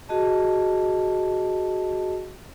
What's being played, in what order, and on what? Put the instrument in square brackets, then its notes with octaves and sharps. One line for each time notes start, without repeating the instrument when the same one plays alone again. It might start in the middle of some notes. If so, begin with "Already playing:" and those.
[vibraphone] F#4 G#4 D#5 A5